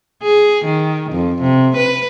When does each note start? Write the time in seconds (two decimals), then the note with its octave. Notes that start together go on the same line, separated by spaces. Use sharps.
0.23 G#4
0.65 D#3
1.12 F2
1.42 C3
1.77 B4